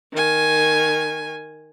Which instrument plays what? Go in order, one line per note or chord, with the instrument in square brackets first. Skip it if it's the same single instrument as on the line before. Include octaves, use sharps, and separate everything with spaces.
[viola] D#3 G#5